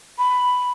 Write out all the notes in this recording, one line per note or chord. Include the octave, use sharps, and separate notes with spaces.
B5